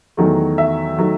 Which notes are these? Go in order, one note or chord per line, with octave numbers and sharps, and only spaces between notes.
E2 D#3 F#3 A3
E5
D#3 F#3 A3